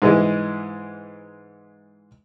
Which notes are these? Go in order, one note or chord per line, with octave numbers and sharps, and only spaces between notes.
G#2 E3 G#3